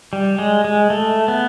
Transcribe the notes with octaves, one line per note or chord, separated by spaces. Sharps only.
G3
G#3
G#3
A3
B3